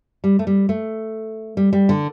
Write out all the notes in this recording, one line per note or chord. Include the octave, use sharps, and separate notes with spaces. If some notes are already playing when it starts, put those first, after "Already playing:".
G3
A3
G3
A3
G3
G3
D3